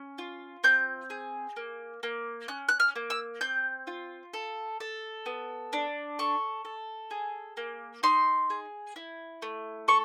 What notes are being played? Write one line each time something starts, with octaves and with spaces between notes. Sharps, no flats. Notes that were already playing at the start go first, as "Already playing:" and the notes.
Already playing: C#4
F4
C4 G6
G#4
A#3
A#3
C#4 F#6
F#6
F6
A#3
E6
C4 G6
F4
A4
A4
B3
D4
A4 C#6
A4
G#4
A#3
D#4 C6
G#4
E4
A3
A4 C#6